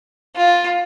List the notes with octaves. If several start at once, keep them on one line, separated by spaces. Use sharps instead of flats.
F4